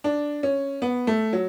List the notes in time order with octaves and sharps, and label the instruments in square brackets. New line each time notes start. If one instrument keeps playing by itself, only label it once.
[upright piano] D4
C#4
B3
A3
F#3